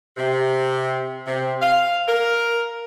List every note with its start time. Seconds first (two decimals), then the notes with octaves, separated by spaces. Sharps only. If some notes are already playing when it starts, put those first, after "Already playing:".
0.17 C3
1.27 C3
1.62 F5
2.08 A#4